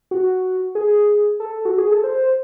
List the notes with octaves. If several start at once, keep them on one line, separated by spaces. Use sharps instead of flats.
F#4
G#4
A4
F#4
G#4
A4
C5